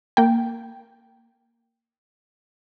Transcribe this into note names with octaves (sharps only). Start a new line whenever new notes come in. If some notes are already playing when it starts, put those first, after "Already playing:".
A#3 G5